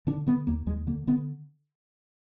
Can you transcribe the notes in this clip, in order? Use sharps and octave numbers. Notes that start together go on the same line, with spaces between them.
D3 D4
D3 B3
D#2 A#3
D#2 G#3
D3 A#3
D3 B3